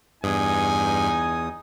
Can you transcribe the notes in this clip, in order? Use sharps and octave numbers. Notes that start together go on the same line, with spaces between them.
E2 G2 D#4 G#5 D#6